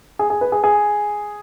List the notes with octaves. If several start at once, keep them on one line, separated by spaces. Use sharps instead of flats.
G#4
G#4
B4
G#4
G#4